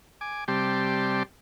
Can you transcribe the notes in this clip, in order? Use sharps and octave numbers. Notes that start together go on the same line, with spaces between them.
G#5 D6
C3 G3 G4 D5 A5 C6